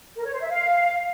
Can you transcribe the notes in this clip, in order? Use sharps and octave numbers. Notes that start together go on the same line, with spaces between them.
A#4
C#5
C5
E5
F5